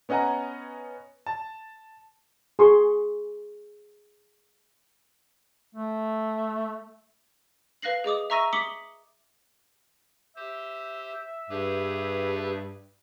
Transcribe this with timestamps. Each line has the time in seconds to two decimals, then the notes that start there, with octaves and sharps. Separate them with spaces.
0.09 B3 C#4 D#5 F#5 G#5 A#5
1.26 A5
2.59 G#4 C6 C#6
5.75 A3
7.82 B4 F5 F#6 A#6 C7 F#7
8.04 G#4 D#5 D6 D#6
8.30 E5 A#5 C#6 E6 A#6 D#7
8.53 D6 D#6 B6 C#7 F#7 G7
10.36 G4 C5 E5
11.50 G2 G4 G#4 B4